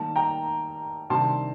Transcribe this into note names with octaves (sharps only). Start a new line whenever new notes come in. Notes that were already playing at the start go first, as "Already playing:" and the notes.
Already playing: D#3 G3 A#3 A5
G5 A#5
C3 D#3 G3 D4 A5 C6